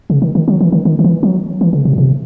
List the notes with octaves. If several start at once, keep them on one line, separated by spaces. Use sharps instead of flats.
C#3
D#3
D#3
F#3
E3
D#3
D#3
D#3
E3
F#3
E3
C#3
C3
A2
C3